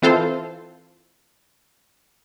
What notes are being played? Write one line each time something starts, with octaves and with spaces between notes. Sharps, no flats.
E3 C4 F4 A4 C5